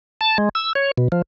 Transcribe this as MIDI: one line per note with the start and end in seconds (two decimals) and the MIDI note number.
0.21 0.38 81
0.38 0.49 56
0.55 0.73 88
0.75 0.91 73
0.98 1.08 47
1.12 1.22 53